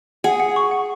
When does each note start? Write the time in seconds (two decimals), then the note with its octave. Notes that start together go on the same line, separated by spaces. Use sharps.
0.24 G#4 F#5
0.40 F#5
0.56 C#6
0.71 F#5